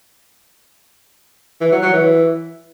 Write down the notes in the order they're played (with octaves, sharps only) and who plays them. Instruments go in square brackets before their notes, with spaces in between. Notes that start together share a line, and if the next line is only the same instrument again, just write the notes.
[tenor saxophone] E3
F#3
F#3
E3